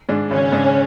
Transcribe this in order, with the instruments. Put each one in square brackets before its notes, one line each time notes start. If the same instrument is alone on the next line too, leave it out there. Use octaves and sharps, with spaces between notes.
[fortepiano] G#2 G#3 D4
[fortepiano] G#1 [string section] C#3 C#4
[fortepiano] G#2 G#3 D4